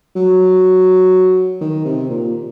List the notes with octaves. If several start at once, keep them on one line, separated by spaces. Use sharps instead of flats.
F#3
D#3
C3
A#2